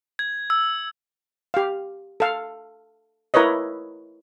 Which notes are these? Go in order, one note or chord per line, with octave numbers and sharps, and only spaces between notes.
G#6
E6
G4 F5
A4 F5
E4 A#4 B4 C#5 D#5